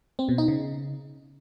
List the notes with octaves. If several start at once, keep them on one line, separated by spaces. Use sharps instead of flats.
C4
B2
D#4
C#3